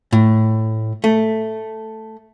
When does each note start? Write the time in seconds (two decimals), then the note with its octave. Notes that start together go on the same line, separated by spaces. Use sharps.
0.12 A2
1.04 A3